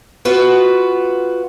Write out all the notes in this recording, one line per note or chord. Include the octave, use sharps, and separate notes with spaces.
B3 F4 F#4 B4